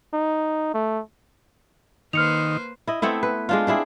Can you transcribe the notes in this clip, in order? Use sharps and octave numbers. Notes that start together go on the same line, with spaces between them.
D#4
A3
D#3 A#3 B4 C5 F6 C#7 F7
E4 D#5
A3 B3 C4 E4
B4
G#3 D4 F4
C4 D4 E4 G#4